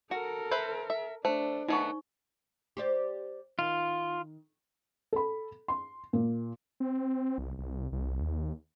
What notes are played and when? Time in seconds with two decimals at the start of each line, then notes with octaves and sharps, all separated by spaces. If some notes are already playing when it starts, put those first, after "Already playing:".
0.11 F#4 A4 A#4
0.51 B4 C5 E5
0.90 E5
1.25 A3 D4 C5
1.68 D#3 A3 B3 D#4 C#6
2.77 G4 C5 D5
3.59 D#3 F4
5.13 A4 B5
5.68 C6
6.13 A#2
6.80 C4
7.38 C2
7.58 C2
7.92 C2
8.21 D#2